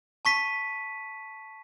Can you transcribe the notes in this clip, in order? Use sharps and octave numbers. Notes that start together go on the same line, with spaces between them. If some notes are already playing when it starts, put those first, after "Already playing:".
A5 C#6 B6 D#7